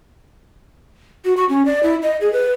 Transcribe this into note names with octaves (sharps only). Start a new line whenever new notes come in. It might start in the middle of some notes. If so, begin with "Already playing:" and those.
F#4
C#6
C#4
D5
E4
D#5
G#4
B4